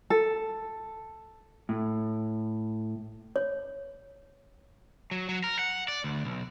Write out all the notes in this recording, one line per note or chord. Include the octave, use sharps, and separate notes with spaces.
A4
A2
C#5
F#3
F#3
A#4
F#5
D5
D2
B1